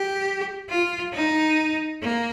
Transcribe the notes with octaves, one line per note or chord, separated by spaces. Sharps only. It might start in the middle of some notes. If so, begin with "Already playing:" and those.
Already playing: G4
F4
D#4
A#3